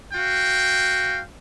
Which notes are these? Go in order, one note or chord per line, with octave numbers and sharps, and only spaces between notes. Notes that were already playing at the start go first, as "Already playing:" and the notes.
F#4 F5 G5